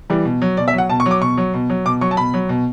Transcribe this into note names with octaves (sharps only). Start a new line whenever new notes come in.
E3 G3
B2
F#3
B2 D5
E5
F#3 F#5
B2 A5
C#6
F#3
D6
B2 C#6
F#3
B2
F#3
B2 D6
F#3 C#6
A5
B2 B5
F#3
B2